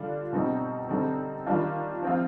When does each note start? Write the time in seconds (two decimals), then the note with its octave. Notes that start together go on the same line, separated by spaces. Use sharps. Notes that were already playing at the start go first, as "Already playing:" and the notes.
Already playing: D3 G3 D4 F4
0.33 B2 G3 C4 D#4
0.89 D3 G3 C4 D#4
1.46 D#3 G3 D4 F4
2.03 F3 C4 F4